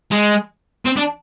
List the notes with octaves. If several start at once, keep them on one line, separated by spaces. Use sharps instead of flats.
G#3
C4
D4